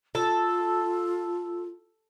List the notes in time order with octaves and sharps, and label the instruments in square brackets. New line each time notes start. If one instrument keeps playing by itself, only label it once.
[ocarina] F4 [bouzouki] A4